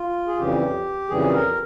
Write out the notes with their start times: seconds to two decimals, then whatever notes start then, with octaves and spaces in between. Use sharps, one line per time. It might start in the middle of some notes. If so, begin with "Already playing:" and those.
Already playing: F4
0.27 G#4
0.37 F2 C#3 E3 G3 G4
1.09 F2 C#3 E3 G3 G#4
1.33 A#4